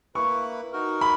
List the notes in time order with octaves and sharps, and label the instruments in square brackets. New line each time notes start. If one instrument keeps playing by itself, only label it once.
[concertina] A#3 E4 B4 [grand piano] C#6
[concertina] D#4 F#4 A#4
[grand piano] B5